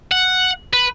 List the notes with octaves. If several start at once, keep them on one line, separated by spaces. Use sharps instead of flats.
F#5
B4